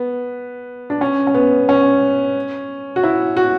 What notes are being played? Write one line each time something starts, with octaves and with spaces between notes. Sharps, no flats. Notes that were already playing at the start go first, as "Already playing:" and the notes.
Already playing: B3
D4
C#4
C#4
B3
C#4
F#4
E4
F#4